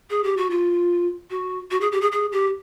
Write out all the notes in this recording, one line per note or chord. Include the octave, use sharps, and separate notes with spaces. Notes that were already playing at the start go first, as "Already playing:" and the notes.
G#4
G4
F#4
F4
F#4
F#4
G#4
G4
G#4
G#4
G4